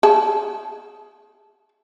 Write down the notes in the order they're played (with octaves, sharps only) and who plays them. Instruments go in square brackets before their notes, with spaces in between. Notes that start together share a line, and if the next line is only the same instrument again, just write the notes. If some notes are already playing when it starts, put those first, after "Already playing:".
[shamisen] G#4 A5